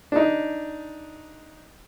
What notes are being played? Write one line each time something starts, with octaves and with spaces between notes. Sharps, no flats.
D4 D#4